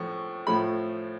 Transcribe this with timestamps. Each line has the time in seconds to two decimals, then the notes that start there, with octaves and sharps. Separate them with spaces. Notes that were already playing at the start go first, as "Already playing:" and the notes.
Already playing: A2 F3 C#6
0.47 A2 F3 A3 B5